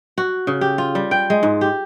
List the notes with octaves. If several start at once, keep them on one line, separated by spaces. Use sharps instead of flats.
F#4
C#3
G4
F4
G3
G5
G#3
G#2
G4